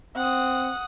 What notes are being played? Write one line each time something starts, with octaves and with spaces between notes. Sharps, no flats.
C4 F#5 D#6